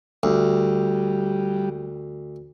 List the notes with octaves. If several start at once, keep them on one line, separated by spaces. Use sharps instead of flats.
D2 G3